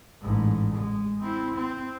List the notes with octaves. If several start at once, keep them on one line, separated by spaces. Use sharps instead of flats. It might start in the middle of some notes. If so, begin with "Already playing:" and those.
A1 G#2
G#3
C4 E4
C4